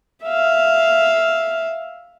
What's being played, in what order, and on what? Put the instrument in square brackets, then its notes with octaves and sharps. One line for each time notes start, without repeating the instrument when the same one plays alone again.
[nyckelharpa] E5 F5